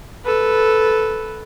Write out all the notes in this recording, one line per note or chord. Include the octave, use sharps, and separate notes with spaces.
A4 B4